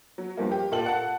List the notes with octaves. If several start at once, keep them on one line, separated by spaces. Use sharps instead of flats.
F#3
G2 F3 G3 A#3
G4
A#2 F4 A4 G5 F#7
F#5 A5